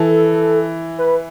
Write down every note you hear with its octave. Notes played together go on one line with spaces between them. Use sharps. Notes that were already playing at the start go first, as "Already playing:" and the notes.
Already playing: E3 A4
B4